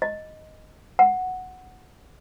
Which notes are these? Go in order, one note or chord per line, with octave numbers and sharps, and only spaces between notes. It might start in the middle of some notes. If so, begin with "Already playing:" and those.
D#5
F#5